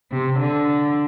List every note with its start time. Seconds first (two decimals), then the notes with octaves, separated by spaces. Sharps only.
0.12 C3
0.40 D3